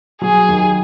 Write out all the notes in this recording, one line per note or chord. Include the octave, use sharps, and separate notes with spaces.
F#3 G#4
D#2